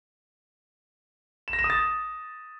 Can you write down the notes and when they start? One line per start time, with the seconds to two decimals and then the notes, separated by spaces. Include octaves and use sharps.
1.48 E7
1.53 A#6
1.59 E7
1.64 D#6
1.70 A6